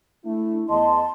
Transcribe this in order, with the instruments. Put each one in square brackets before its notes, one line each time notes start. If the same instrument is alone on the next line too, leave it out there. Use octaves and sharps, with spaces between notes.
[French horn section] A3 E4 [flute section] D4
[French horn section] E2 D#5 [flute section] A5 C6